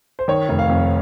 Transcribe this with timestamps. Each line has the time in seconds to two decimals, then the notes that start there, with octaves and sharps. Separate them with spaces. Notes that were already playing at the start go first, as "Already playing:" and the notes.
0.19 C5
0.28 D#3 C#5
0.49 F1
0.59 F5
0.69 F2